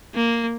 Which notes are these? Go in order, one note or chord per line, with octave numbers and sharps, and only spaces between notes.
A#3